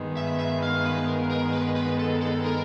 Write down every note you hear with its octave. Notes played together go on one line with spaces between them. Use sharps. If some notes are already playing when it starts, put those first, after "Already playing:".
Already playing: G2 D#3 G#3 B3
E5
E5
F5
B4
A#4
A#4
B4
B4
A4
A4
A#4